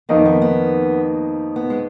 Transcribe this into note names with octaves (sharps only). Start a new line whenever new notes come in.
F2 D#3 A#3 B3 D#4
B3
B3
B3
G#3